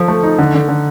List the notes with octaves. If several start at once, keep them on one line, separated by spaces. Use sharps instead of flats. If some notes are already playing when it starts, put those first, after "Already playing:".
Already playing: F3 A4
A3
D#4
D3
D3
D3